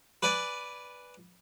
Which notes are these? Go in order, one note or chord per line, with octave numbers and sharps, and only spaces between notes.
B4 D5 G#5